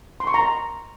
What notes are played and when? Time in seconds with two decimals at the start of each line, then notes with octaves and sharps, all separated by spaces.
0.20 C6
0.27 C#6
0.34 A#5